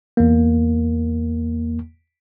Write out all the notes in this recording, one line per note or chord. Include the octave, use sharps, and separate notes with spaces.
E2 A#3